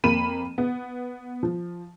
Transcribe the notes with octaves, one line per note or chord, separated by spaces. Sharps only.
F2 A#3 B5 D#7 E7
B3
F3